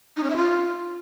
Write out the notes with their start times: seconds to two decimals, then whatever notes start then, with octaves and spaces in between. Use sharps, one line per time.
0.17 D#4
0.23 C#4
0.30 E5
0.37 F4